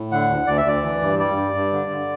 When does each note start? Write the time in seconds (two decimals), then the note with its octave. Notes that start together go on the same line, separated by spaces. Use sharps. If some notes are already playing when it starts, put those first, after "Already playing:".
Already playing: A2
0.12 D3 F#5
0.29 D2
0.47 D2 D5
0.58 E5
0.65 D2 D5
0.83 E3
1.01 G2
1.19 G3 D5
1.36 G2
1.55 G2
1.73 D3
1.90 D3